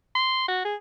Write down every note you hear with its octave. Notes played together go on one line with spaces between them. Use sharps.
C6
F#4
G#4